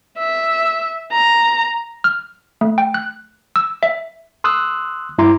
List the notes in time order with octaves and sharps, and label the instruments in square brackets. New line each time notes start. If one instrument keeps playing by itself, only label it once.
[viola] E5
A#5
[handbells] F6
A3
G5
F#6
E6
E5
[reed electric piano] C6 D#6 E6 F#6
G2 E4 A#5 C6 D6